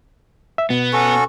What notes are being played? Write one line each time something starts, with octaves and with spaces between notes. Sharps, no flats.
E5
B2 B3
C#4 F#4 A4